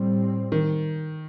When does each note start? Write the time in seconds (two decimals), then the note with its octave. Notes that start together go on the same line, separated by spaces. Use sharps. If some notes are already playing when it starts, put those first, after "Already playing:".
Already playing: A2 G3 C4
0.52 D#3